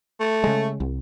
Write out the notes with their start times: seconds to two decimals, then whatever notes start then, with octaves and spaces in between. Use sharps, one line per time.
0.20 A3
0.44 C#3 G#3
0.80 C2